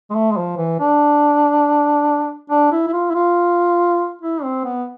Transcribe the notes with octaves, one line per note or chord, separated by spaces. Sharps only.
G#3
A3
G#3
F3
E3
D4
D4
E4
E4
F4
E4
F4
E4
C4
B3